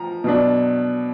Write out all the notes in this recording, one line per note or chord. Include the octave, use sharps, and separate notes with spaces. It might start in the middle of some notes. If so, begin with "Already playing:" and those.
Already playing: F3 A#5
B2 F#3 D4